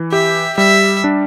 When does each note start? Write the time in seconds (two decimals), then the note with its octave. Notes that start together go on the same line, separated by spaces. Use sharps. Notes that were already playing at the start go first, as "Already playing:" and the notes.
Already playing: E3
0.11 G4 E5
0.58 G3 E5
1.04 D4